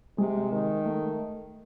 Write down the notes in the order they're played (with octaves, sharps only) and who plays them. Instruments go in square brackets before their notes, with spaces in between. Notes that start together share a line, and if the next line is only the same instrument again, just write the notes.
[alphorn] C3 [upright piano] G#3
[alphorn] D#3
[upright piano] A3